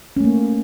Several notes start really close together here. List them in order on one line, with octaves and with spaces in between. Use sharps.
C#4 A3 A#3